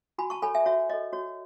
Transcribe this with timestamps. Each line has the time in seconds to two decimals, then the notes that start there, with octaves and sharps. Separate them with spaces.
0.18 F#4 G#5 B5
0.30 A5 C#6
0.42 A4 C#5 G#5 B5
0.55 E5 G#5
0.66 F#4 C#5 E5
0.90 A4 C#5 D#5
1.13 F#4 C#5